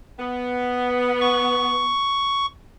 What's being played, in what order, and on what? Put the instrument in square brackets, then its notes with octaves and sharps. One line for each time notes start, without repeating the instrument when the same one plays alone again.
[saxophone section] B3
[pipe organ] C#6